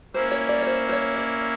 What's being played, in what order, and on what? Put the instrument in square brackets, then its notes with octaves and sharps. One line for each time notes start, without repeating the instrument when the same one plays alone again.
[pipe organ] A#3 C#4 E4 [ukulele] C5
[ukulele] C#5
D5
C#5
C5
C5
C#5
D5